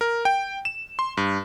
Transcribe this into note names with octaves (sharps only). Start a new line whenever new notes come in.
A#4
G5
E7
C6
G2